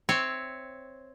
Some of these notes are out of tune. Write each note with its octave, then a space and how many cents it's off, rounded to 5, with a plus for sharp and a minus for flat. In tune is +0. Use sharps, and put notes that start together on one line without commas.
C4 +0 C#5 +0 E5 +0